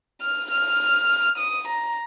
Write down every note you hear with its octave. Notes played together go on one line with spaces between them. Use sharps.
F6
F6
D#6
A#5